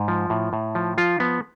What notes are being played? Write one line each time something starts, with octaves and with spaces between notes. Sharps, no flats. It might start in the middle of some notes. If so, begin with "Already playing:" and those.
Already playing: G#2
F3
A2
A2
F3
F3 F4
F3 B3